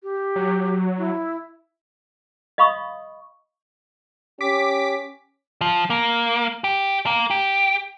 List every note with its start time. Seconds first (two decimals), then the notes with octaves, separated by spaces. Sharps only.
0.03 G4
0.36 F#3
0.98 E4
2.58 D#5 F5 B5 C#6 D#6
4.41 C#4 G4 D6 B6
5.61 F3
5.90 A#3
6.64 G4
7.06 A#3
7.30 G4